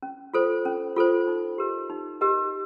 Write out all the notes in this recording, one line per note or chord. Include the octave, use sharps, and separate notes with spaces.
C#4
F4 A4 C5
C#4
F4 A4 C5
D#4
G4 A#4 D#5
D#4
G4 A#4 D#5